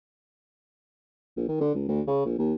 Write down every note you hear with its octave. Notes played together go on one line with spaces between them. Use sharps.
A#1
D#3
D3
C#2
D2
C#3
A#1
D#2